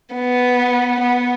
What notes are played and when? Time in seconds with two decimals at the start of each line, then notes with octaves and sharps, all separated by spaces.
0.14 B3
1.01 B3